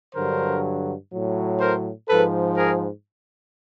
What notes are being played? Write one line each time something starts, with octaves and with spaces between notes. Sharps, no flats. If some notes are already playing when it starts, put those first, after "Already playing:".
G2 D3 F#3 A#4 C5
A2 F#3
A#4 C5
G#2 F3 A4 B4
G#4 A#4